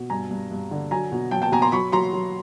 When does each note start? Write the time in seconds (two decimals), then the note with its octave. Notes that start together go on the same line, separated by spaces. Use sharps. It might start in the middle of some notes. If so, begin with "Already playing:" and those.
Already playing: B2
0.10 G2 G#5 A#5
0.31 G2
0.51 G2
0.71 D3
0.91 F#3 G#5 A#5
1.12 B2
1.31 F#3 G5 A5
1.42 G5 A5
1.52 B2 G#5 A#5
1.62 A#5 C6
1.72 F#3 B5 C#6
1.92 F#3 A#5 C6
2.13 F#3